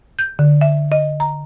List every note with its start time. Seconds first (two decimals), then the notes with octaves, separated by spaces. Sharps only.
0.19 G6
0.39 D3
0.61 E5
0.92 D#5
1.20 A#5